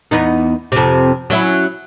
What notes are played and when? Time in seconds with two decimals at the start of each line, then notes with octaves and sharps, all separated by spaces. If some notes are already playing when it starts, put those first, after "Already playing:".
0.11 E2 B3 D#4
0.72 F2 C3
1.30 F#3 C#4 E4